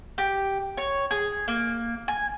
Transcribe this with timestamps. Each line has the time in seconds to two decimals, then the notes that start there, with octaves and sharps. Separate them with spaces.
0.18 G4
0.77 C#5
1.11 G#4
1.48 A#3
2.08 G#5